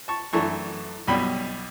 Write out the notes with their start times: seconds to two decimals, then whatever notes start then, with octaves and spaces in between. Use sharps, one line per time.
0.08 A5 C#6
0.33 F#2 E3 A3 D4 A5 C#6
1.07 B1 B2 G3 G5 B5